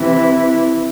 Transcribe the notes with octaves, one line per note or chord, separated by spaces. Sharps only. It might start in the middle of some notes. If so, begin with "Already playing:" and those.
Already playing: C3 E3 E4